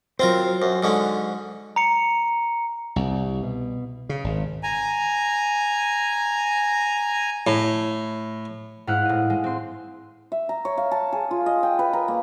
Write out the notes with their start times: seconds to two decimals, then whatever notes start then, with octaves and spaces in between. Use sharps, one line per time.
0.20 F#3 C4 F4 A#4 C5
0.62 F#2
0.83 G#2 D3 C#4
1.76 A#5 C#7
2.96 C2
3.43 B2
4.09 C#3
4.24 G#1
4.63 G#5 A#5
7.47 A2
8.87 G#2 E4 F5 F#5
9.05 A2 D#5
9.30 G#3
9.44 C4 C6
10.32 E5
10.49 A#5
10.65 C#5
10.77 F5
10.91 A5
11.13 G#4
11.31 F4
11.46 D#5
11.63 G5
11.79 B4
11.93 A#4
12.08 A#3